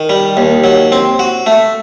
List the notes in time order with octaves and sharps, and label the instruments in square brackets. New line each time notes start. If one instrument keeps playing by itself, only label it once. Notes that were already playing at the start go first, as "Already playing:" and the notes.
Already playing: [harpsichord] D#3
G3
D#2
F#3
C4
F#4
A3